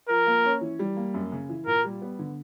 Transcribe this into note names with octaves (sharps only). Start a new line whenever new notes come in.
F3 A#4
A#3
C#4
E3
G3
A#3
F#2
C#3
E3
A#2 A#4
G3
B3
D3